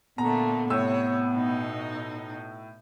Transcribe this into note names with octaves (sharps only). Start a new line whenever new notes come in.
A#2 D3 A3 B3 A#5
A2 C3 C#5 E6
B2 D#4